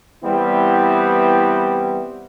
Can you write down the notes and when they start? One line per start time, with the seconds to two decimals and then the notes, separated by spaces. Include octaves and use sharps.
0.24 E3 G3 B3 C4 E4